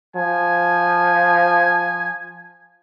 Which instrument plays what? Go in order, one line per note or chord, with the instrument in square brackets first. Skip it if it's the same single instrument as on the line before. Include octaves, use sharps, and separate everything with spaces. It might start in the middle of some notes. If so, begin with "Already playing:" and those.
[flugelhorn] F3 [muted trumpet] G#5